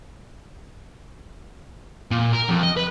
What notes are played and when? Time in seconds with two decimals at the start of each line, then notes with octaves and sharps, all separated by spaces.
2.11 A#2
2.33 A#4
2.49 F2
2.63 D#5
2.77 B4